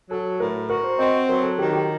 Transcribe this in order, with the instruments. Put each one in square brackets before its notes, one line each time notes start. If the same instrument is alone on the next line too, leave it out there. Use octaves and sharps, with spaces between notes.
[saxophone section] F#3 [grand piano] A4
[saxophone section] A2 [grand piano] A#4
[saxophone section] F#4 [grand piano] A#4
[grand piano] C5
[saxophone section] C4 [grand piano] D#5
[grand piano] C5
[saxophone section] F#3 [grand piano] A#4
[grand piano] A4
[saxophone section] D#3 [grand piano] G4
[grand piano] G4